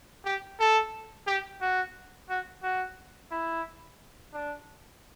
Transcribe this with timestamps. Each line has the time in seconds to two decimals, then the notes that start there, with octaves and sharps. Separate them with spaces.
0.25 G4
0.59 A4
1.27 G4
1.61 F#4
2.29 F#4
2.63 F#4
3.31 E4
4.33 D4